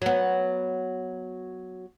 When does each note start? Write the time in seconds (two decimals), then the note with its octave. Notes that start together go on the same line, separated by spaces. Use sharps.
0.02 F#3 B3